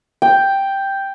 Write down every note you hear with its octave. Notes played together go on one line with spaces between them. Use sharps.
G5